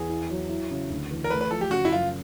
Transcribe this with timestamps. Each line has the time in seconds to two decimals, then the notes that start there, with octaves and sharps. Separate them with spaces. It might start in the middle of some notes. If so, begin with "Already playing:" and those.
Already playing: E2 G#4
0.09 E4
0.30 F#3
0.49 E4
0.71 C#3
0.90 D2
1.11 E3
1.24 A#4
1.30 A3 B4
1.41 B4
1.51 F3 A4
1.61 G4
1.71 C#3 F#4
1.85 E4
1.92 F#2 F4